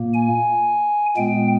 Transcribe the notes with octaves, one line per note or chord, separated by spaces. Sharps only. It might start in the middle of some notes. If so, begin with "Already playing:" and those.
Already playing: A#2 A#3
G#5
A#2 G#3 B3 G5